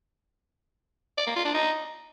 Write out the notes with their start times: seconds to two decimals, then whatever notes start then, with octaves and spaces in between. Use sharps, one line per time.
1.18 D5
1.27 A#3
1.36 F4
1.45 D4
1.54 D#4